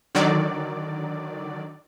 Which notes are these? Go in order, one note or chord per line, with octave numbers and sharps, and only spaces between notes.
D3 D#3 F#3 D5